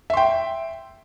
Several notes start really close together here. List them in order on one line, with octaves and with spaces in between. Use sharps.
E5 C6 G5